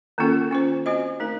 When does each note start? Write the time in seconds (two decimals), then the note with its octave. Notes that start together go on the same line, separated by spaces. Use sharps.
0.18 D#3 A#3 C#4 F4 A4
0.51 C#4 F4 C5
0.86 C4 F#4 C5 D#5
1.20 A3 D#4 A#4